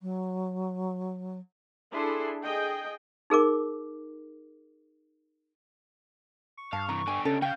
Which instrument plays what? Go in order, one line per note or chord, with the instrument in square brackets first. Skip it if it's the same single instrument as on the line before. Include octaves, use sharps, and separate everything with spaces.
[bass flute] F#3
[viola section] D4 E4 G#4 A4 C6
G#4 D#5 G5
[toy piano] D#4 G#4 A#4 D6
[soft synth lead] C#6
[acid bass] G2 [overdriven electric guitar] F5 [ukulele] A5
[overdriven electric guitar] C3 E3 [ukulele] A#5
[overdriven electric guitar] D3 G4 [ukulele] G#5
[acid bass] C#3 [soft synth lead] C#4 [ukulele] A4
[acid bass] C#3 [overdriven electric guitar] C#4 F5 [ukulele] G5 [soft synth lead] G6